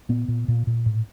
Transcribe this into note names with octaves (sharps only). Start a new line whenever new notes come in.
A#2 B3
A#2
A#2
A#2
A2